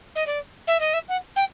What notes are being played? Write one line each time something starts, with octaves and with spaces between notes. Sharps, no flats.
D#5
D5
E5
D#5
E5
F#5
G5